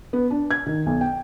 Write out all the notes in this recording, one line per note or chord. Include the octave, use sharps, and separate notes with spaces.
B3
D4
G#6
D#3
B1
G5